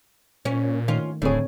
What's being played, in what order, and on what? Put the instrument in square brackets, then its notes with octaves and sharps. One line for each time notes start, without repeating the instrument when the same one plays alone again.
[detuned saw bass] A#2 [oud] C#4
[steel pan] D#3 A3 [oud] C#4 F4
[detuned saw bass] D1 [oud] A2 G#4 [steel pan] D3 C4 C#5